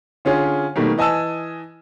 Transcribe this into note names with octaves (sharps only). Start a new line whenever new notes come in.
D3 C#4 F4 G#4
B2 D#3 G3 A3 A#3
E3 D#5 G#5 A5 E6